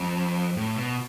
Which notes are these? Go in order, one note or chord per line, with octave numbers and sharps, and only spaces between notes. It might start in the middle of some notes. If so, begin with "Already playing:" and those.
Already playing: F2
A2
B2